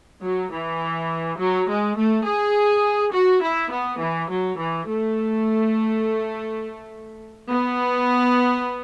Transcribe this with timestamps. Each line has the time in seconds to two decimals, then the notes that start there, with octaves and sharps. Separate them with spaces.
0.23 F#3
0.52 E3
1.39 F#3
1.69 G#3
1.97 A3
2.26 G#4
3.14 F#4
3.43 E4
3.72 B3
4.01 E3
4.30 F#3
4.59 E3
4.88 A3
7.49 B3